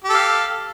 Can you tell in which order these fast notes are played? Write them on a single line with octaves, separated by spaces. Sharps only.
G4 A4 F5